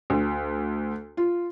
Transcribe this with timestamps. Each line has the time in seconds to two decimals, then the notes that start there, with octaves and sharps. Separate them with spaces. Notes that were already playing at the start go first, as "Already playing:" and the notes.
0.10 D2
1.17 F4